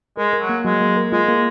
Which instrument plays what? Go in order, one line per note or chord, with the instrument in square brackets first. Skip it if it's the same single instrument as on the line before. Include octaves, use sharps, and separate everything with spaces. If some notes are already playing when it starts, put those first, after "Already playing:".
[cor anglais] G#3 [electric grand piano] A#4
[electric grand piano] A#4
[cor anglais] F#3
[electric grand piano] A#3
[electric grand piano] F#3 [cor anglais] G#3
[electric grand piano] A#3
A#4
[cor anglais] G#3 [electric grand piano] F4
[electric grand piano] A#3